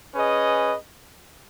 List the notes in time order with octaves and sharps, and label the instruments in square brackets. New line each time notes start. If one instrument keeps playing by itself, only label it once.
[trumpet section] C#4 G#4 B4 D#5